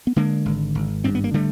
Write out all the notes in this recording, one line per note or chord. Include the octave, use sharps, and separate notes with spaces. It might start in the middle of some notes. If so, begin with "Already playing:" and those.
B3
D3 G#3 A#3
G#1
G#1
G2 C4
B3
A#3
D3 G3 A3